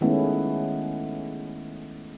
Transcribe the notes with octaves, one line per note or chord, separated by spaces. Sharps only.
D#3 G#3 A3 B3 C#4 E4